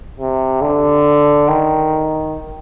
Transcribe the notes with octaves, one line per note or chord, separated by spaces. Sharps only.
C3
D3
D#3